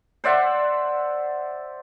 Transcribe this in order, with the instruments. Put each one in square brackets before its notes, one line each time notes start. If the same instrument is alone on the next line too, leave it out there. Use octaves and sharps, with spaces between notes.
[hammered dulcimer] C5 D5 E5 F#5